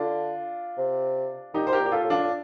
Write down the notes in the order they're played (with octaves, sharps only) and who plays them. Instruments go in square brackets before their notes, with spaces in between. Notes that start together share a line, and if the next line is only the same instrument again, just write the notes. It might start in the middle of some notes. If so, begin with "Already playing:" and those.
Already playing: [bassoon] D3 [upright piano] D4 F4
[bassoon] C3
[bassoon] A#2 [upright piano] D#4 G4
[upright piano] C5
G4 A#4
[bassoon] A#2
[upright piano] G4
F4 A4
[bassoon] A2
[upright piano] D4 F4
[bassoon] A2